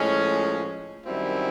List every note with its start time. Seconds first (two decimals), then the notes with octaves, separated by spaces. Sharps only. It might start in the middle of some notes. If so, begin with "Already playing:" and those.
Already playing: A2 F3 G#3 C#4
1.05 F#2 D#3 G3 C4 E4